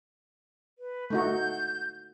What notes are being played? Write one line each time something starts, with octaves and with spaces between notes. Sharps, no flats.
B4
A3 D#4 F#4 G6